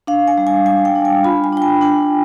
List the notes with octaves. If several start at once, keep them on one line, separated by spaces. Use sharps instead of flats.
D4 F5
G#5
G3
G#5
G3 G#5
G5
D4
G#5
F4 B5
G#5
D4 G5
G#5
D4 G#5